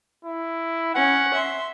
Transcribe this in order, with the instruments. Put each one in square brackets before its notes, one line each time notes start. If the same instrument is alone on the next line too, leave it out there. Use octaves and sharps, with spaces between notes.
[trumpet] E4
[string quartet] C#4 [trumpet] F#5
[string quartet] E5 C6